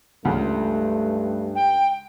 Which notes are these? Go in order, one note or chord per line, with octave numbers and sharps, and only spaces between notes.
C#2 G2 A3
G5